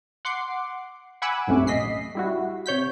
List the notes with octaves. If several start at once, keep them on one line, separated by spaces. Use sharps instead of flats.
F#5 C6 D6 C7
F#5 G#5 B5 D6 E6 F#6
B1 F#2 C3 A3 C#4
A1 D#5 B6 C7
G3 E4 F#4
C3 C#5 G6 B6